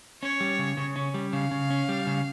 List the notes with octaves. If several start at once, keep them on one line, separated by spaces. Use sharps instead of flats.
C#4 C#5
G3
C#3
C#3
C#4
G3
C#3 F5
C#3
C#4
G3
C#3